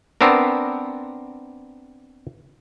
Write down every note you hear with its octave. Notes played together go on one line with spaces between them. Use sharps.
B3 C4 D4 A#4